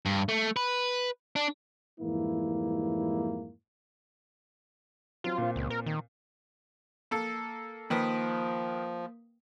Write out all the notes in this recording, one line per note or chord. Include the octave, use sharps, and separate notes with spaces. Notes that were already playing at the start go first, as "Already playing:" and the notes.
G2
A3
B4
D4
F2 G#2 E3 G3 A#3 E4
F#3 C4 F4
A#2 C4
C#2
A#4
D#3
A#3 A4
D#3 F3 A#3 B4 D#6 B6